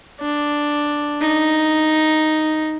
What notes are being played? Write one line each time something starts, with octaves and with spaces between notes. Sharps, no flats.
D4
D#4